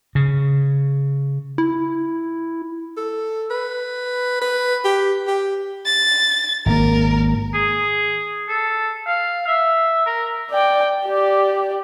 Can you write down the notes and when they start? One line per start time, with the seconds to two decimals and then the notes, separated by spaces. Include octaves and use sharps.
0.15 C#3
1.58 E4
2.97 A4
3.50 B4
4.41 B4
4.84 G4
5.27 G4
5.86 A6
6.66 G#1 A#3 A#4
7.54 G#4
8.49 A4
9.06 F5
9.47 E5
10.06 A#4
10.51 D5 G5
11.05 G4 D5